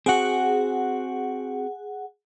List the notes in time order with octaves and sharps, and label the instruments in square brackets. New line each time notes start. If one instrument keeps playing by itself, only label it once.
[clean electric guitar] C4 F#4 [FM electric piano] G#4 F#5